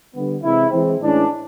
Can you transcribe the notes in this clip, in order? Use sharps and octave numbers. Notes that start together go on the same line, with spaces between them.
D3 G3 B3
C3 E3 G#3 C4 E4
E3 G#3 C4
A2 E3 G#3 C#4 D4